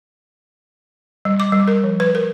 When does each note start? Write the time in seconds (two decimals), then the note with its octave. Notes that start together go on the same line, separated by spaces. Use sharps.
1.25 G3
1.40 D6
1.52 G3
1.68 A#4
1.84 F3
2.00 B4
2.15 A#4